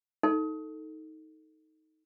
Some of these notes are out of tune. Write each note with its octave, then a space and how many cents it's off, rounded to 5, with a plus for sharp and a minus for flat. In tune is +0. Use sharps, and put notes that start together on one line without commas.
D#4 +15 A4 +5